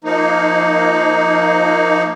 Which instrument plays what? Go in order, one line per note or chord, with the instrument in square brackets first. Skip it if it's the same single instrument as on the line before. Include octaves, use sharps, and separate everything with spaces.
[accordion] F3 A#3 D#4